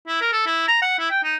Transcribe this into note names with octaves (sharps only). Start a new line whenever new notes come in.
E4
A#4
A4
E4
A#5
F#5
E4
G5
D#4